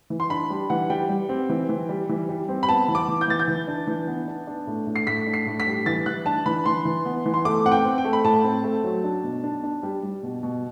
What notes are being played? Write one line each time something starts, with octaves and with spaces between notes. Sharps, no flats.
E3
C6
D4 B5
G3
E3 F#5
G3 G5
G3
C4
E3
E3
G3
E3
G3
C4
B5
B3 A5
E3
D6
E3
G6
E3 A6
G6
E3
D4
E3
B3
D4
D4
A2
A2
C7
A2 B6
D4
C7
A2
B6
G3
E3 A6
E3 F#6
D4 A5
E3 B5
E3 C6
E3
B3
E3
C6
A3 D6
C4 F#5
G5
C4
G5
A3
B5
A2 A5
C4
A3
F#3
D4
B2
D4
D4
G3
G3
B2
B2